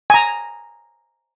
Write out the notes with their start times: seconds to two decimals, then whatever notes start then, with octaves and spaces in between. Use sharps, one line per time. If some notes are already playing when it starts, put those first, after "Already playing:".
0.10 G#5 A#5